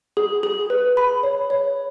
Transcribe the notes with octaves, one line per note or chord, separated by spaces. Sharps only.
G#4
G#4
B4
B5
C#5
C#5